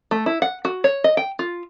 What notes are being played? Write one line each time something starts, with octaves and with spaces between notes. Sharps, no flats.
A3
E4
F#5
F#4
C#5
D#5
G5
F4